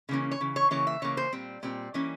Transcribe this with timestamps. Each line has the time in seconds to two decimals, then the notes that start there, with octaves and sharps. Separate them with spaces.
0.09 C#3 E3 A#3 C#4
0.31 C#5
0.41 C#3 E3
0.56 C#5
0.71 C#3 E3 A#3 C#5
0.87 E5
1.02 C#3 E3 A#3 C#5
1.17 C5
1.32 A#2 G3 C4
1.63 A#2 G3 C4
1.94 E3 G3 A#3 C#4